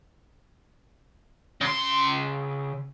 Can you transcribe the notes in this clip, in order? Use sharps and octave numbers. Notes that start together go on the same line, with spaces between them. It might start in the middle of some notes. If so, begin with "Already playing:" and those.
C#3 C6